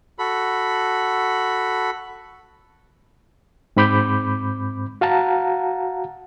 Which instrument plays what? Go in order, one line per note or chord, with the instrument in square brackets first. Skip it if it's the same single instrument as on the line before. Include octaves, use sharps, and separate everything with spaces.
[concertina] F#4 A4 B5
[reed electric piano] G#2 C4 B5 D6 G6
F#4 F5 F#5 A5 A#5